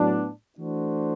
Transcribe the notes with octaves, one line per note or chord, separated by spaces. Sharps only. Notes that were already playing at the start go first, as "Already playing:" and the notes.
Already playing: A2 F#3 B3 D4
E3 A3 D4 F#4 C5